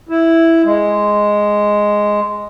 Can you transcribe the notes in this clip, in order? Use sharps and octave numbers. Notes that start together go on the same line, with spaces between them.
E4
G#3